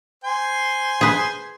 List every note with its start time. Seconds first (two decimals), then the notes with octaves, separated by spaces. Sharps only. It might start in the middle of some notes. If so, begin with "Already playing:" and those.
0.24 C5 G#5
1.01 G#4 B4